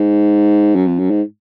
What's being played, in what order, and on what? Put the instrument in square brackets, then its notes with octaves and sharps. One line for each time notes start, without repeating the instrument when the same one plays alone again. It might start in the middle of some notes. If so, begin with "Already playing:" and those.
Already playing: [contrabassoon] G#2
F#2
F2
F#2
G#2